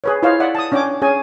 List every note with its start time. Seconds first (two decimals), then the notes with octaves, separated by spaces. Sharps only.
0.04 G#4 B4 C#5
0.23 E4 F4 C5 C#5 D#5 F5
0.40 D5 E5 F#5
0.55 A5 D#6
0.72 C#4 D4 C#5 G5 D6
1.02 C#4 G#4 C#5 G#5